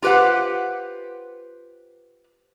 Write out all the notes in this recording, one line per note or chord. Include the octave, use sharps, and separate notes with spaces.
F4 G4 B4 C5 F#5